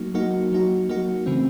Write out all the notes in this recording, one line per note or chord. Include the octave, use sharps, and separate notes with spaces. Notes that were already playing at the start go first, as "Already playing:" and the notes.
Already playing: F#3 A#3 D#4 F#4
F#3 A#3 D#4 F#4
F#3 A#3 D#4 F#4
F#3 A#3 D#4 F#4
C#3 E3 A3 C4